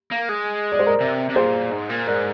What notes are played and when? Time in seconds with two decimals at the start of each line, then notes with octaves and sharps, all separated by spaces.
0.12 A#3
0.29 G#3
0.72 D5
0.79 C5
0.87 A#4 D5
1.01 C3
1.30 C3
1.36 A#2 G#4 C5
1.72 G#2
1.90 A#2
2.07 G#2 A#4 D5